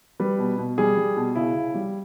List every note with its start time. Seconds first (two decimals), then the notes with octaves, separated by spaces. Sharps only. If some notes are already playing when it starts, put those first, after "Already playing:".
0.20 G3 B4
0.39 B2
0.58 B2
0.78 G3 G#4
0.97 G3
1.17 B2
1.35 C#3 E4
1.55 C#3
1.74 G3